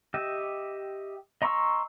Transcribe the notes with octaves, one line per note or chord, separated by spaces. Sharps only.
G4 D#5 E5
D#5 A#5 C6 C#6 E6